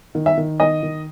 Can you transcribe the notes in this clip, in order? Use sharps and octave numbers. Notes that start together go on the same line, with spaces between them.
D#3
E5
D#3
D#3 D#5
D#3